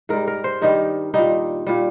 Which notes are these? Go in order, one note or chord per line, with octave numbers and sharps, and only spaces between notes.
G#2 G3 A#4
A#4
C5
G2 D#3 G3 D#4
A#2 G3 D#4
A#2 G3